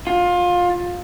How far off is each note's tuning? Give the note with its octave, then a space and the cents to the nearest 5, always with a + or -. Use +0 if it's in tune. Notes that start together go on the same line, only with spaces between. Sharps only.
F4 +25